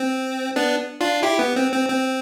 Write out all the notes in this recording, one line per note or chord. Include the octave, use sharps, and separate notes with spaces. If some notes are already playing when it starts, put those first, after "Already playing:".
Already playing: C4
B3 D4
D4 F4
E4 G4
B3
C4
C4
C4